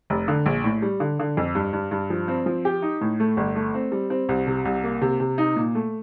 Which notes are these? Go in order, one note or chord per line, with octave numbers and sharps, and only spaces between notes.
F1
D3
A#1
A2
G3
D3
D3
F2
G2
G2
G2
F3
C4
F3
G4
D#4
A2
A3
G1
A3
C4
G3
C4
C2
C3
C2
A#3
C3
C3
D#4
A#2
A3